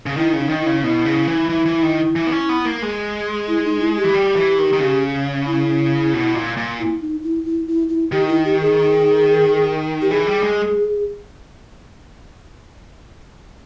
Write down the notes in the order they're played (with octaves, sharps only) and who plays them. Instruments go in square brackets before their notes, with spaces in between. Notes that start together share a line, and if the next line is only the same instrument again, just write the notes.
[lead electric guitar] C#3
[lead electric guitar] D#3 [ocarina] E4
[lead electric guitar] C#3
[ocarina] D#4
[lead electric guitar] D#3
[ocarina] E4
[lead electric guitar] C#3
[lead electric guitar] B2 [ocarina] E4
[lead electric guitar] C#3
E3
E3
E3
D#3
E3
B3
C#4
B3
A#3
G#3
[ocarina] E4
D#4
E4
G4
[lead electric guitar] E3
G3
E3
D#3
D#3
C#3
[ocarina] E4
[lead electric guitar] B2
A#2
A#2
[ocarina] E4
D#4
E4
E4
E4
E4
[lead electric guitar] D#3 [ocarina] G4
[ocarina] E4
G4
G#4
G4
[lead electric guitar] E3 [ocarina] G#4
[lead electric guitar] G3
G#3